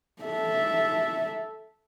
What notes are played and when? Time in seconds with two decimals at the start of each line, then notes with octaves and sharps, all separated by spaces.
0.23 A4 E5